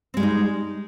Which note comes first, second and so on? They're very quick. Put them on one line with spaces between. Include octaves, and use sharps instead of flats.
C4 G#3 G3 D#4